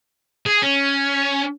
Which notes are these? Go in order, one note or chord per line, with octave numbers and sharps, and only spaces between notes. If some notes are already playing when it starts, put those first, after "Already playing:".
G#4
C#4